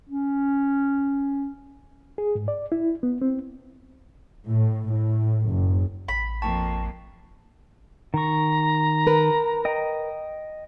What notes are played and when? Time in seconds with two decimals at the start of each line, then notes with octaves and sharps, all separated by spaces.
0.09 C#4
2.18 G#4
2.35 G#2
2.48 D5
2.72 E4
3.03 B3
3.22 C4
4.49 A2
4.90 A2
5.49 F#1
6.08 A1 B5
6.42 F2 A#3 G5 A5 C#6
8.14 D#3 A#5 C#6
9.07 A#4 B4
9.65 D#5 G5